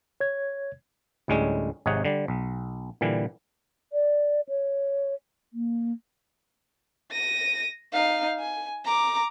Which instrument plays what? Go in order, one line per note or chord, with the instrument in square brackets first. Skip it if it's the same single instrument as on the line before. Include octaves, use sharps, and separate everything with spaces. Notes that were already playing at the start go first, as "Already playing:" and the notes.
[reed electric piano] C#5 G#6
[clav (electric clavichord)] D2 A2 G3 G#3 C#4
G#1 C3 D#4 G#4 C#5 F#5
D3 G3
B1
A#2 D3 E3 G3
[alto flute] D5
C#5
A#3
[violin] A#6 D#7
D#4 F5
G#5
A#5 D6